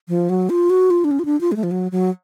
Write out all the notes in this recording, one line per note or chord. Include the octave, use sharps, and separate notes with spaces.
F3
F#3
F4
F#4
F4
D4
C#4
F4
D4
F4
G#3
A3
F3
F#3
F#3